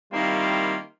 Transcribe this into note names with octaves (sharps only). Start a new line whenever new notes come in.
D#3 G3 A#3 C4 E4 F4